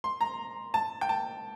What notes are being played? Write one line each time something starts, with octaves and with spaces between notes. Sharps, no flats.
C6
A#5
A5
G5
A5